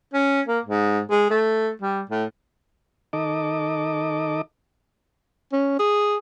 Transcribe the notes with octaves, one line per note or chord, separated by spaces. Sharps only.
C#4
A#3
G#2
G#3
A3
G3
A2
D#3 D#4 A4 D#5 D6
C#4
G#4